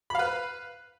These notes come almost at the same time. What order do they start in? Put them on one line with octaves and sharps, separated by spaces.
B5 F5 B4